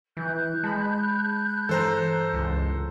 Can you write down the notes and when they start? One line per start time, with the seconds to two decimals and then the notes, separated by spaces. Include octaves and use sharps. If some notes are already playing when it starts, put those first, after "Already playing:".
0.17 E3 F#6 G6
0.63 G#3 A5 B5
1.69 G2 E3 A4 C5 A#5
2.34 C#2